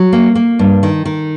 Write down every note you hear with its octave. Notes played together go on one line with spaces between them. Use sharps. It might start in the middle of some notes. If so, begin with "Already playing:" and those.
Already playing: F#3
A#3
A#3
G2
D#3
D#3